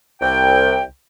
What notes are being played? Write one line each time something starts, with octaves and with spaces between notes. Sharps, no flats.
C2 G5